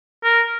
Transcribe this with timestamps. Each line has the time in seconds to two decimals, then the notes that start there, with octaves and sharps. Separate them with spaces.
0.24 A#4